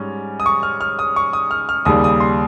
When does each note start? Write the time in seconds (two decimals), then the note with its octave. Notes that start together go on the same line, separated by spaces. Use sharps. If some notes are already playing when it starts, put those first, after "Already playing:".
Already playing: G#2 G3 C#4
0.40 D#6
0.46 C#6
0.63 F6
0.81 F6
0.99 D#6
1.16 C#6
1.33 D#6
1.51 F6
1.69 F6
1.85 D#2 C#3 G3 D#6
2.04 D#6
2.20 C6